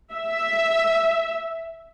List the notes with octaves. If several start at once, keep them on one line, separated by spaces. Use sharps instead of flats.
E5